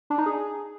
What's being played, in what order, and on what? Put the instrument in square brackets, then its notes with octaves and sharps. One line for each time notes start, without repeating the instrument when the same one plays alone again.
[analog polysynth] D4
D#4
G#4